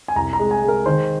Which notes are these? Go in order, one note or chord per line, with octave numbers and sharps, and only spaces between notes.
G#5
C2 A#5
A#5
G#3
G#5
G#3
A#4
D#3 C5